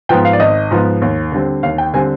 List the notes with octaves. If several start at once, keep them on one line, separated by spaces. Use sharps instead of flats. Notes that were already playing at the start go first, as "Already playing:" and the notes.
G#2 F3 B3 G5
F5
D5
G#1 D#5
G#2 F3 B3
D#2
D3 G3 C4
D#2 F5
G5
D3 G3 C4 G#5